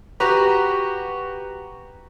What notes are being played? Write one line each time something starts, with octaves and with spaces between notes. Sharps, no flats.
F#4 G4 B4 A#5